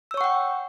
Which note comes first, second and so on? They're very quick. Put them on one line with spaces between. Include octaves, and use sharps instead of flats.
E6 C#5 C#6 F#5 G5